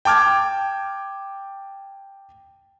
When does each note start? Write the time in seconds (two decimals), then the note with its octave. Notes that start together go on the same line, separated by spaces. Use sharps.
0.05 G5 A5 D6 F6 G#6